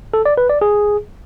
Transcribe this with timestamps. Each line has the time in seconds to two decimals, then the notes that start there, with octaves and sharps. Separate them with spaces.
0.14 A4
0.26 D5
0.38 B4
0.50 D5
0.61 G#4